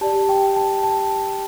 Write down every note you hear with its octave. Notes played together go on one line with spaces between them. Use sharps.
G4 D5 A5
G5
A5
A5